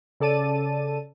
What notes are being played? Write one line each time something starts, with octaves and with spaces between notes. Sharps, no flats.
C#3 A4 D5 A5 D#7